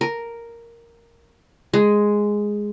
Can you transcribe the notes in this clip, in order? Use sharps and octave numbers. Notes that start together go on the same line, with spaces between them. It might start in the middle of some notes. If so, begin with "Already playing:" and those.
A#4
G#3